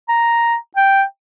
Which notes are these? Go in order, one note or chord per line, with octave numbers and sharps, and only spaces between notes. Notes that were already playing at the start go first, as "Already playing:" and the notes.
A#5
G5